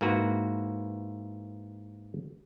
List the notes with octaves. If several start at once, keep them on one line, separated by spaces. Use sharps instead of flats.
G#2 E3 A#3 F#4 B4